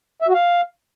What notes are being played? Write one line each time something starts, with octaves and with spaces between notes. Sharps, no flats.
E5
F#4
F5